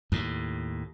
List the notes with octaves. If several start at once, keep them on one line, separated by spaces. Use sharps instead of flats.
D#2 A2